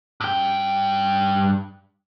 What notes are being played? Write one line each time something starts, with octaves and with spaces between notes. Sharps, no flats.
G2 G5